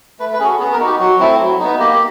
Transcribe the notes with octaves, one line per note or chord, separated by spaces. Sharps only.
A3 B4
B4
C#4 F#4 G#4 A4
B3 G#4
A#4
D#4 F#4
G4
F#3 F#4
A3 C4 E4
F#3
B3 D#4
A#3 G4